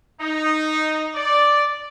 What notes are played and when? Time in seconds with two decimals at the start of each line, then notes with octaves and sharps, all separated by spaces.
0.18 D#4
1.14 D5